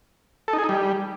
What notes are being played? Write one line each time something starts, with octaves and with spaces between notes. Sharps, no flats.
A4
D#4
G#4
D#4
G3